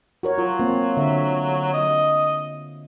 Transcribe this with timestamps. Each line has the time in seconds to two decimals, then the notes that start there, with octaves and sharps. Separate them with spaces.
0.23 F#4 A#4 C#5
0.38 F#3 F4
0.59 A#3 C4
0.97 D3 E5
1.73 D#5